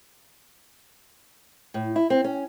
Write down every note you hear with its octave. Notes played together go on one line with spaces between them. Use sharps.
A2
E4
C4
C#4